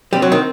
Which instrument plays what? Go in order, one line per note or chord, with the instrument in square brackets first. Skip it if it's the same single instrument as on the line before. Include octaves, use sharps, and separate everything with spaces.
[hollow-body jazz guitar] G3 [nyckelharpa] C4
[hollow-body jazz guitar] F#3
D#3